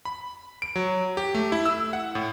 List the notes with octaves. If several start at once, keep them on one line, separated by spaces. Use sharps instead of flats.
B5
D7
F#3
G4
A3
E4
E6
F#5
A2